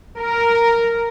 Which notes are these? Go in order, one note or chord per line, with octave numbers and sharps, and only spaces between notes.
A#4